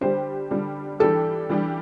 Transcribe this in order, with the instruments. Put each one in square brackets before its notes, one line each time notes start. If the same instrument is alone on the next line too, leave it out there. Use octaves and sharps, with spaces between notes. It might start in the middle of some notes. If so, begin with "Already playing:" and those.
[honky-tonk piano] D3 G3 D4 G4 [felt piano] C5
[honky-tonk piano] D3 G3 D4 G4
[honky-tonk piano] E3 G3 D4 G4 [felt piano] A4
[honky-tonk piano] E3 G3 D4 G4